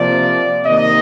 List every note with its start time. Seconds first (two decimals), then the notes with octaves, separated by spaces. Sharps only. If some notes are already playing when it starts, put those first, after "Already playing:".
Already playing: C3 F3 A#3 D5
0.65 C3 D#3 A#3 D#5